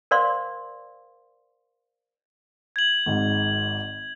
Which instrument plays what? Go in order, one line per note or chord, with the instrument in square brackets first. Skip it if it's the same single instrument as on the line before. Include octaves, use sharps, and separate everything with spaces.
[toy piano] A#4 C5 D5 F5 C6
[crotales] G#6 F#7
[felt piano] G#1 G#2